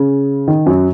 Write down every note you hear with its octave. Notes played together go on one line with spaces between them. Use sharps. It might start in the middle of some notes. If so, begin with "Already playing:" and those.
Already playing: C#3
D#3
F#2 F#3